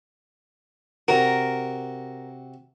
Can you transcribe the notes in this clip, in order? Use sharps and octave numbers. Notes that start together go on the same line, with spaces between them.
C3 F#4 A#4